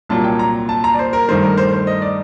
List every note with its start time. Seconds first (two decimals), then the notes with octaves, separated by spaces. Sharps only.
0.09 C2 A#2 F#3 A#3 A5
0.24 G5
0.39 A#5
0.69 A5
0.84 A#5
0.94 D5
0.99 C5
1.13 A#4
1.29 G2 D#3 A3 C5
1.43 A#4
1.58 C5
1.73 C5
1.87 D#5
2.02 D5